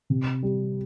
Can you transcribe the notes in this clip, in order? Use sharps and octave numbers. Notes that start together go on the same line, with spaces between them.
C3
G3